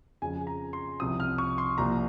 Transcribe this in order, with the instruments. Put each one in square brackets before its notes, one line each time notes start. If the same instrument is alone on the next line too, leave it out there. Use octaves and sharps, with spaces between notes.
[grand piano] F2 C#3 F3 G#5
A#5
C6
C2 C3 F3 D#6
F6
C#6
C6
C2 A#2 F3 A#5